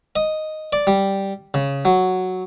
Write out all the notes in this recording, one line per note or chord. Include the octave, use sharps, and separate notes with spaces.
D#5
D5
G3
C#3
F#3